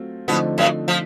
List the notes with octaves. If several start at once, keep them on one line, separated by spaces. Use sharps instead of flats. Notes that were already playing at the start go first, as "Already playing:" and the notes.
Already playing: F#3 A3 C4 F4
B2 D3 F3 A3 B3 C4 D#4
F#2 F#3
F3